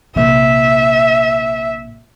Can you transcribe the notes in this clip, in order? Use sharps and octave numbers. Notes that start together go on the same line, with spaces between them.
A#1 C3 E5